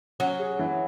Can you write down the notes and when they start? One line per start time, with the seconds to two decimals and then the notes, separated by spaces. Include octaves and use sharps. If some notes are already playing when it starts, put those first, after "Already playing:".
0.20 F#3 C#4
0.39 G#4
0.59 E3